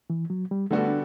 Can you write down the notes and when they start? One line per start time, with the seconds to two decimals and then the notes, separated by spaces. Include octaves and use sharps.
0.10 E3
0.30 F#3
0.51 G3
0.70 D3 G3 A3 B3 F#4 A4
0.88 D4